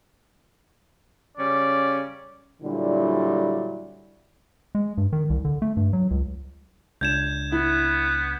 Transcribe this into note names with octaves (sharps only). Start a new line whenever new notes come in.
C#3 G3 C#4 D5
A#2 D3 F#3 G3 E4
G#3
G2
D#3
C2
D3
A3
G2
F#3
C#2
C#2 D4 G6 G#6 E7
B3 E4